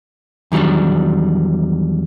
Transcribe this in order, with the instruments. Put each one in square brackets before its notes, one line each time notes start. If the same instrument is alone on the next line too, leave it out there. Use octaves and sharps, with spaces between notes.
[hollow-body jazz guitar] E2 D#3 F#3 G3 D4